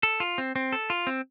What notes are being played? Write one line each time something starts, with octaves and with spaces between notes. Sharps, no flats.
A4
F4
C4
C4
A4
F4
C4